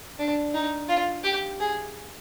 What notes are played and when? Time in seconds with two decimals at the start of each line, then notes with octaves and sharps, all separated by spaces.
0.19 D4
0.54 D#4
0.89 F4
1.24 G4
1.60 G#4